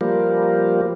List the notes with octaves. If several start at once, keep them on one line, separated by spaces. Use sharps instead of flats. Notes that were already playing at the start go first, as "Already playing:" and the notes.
F3 G3 A#3